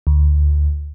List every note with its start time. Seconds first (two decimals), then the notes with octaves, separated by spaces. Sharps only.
0.07 D2